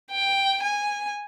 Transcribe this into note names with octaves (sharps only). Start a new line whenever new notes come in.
G5
G#5